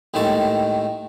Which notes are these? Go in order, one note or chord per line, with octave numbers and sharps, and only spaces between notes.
D#2 A2 D#3 G#3 A5 C#6